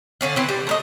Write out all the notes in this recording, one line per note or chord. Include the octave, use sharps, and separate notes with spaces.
D3 F#3 C#4 F4
E3 C4
G3
A3 A#4 D#5